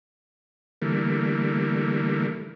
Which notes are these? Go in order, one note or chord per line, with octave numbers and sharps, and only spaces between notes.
D3 E3 G3 A3 A#3